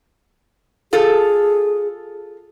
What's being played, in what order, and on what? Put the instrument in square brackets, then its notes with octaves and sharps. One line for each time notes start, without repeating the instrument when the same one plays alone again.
[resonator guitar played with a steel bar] F4 A4 [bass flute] G#4